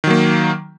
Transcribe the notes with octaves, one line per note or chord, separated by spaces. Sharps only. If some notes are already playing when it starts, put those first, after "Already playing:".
D#3 F#3 A#3